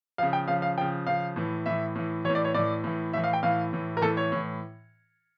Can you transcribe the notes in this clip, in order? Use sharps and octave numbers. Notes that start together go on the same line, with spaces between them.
C#3 F3 F5
G5
C#3 F3 F5
F5
C#3 F3 G5
C#3 F3 F5
A2 E3
A2 E3 E5
A2 E3
A2 E3 C#5
D5
C#5
A2 E3 D5
A2 E3
A2 E3 E5
F5
G5
A2 E3 F5
A2 E3
A#4
A2 E3 A4
C#5
A2 E3